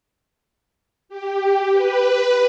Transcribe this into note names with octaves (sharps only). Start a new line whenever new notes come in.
G4
B4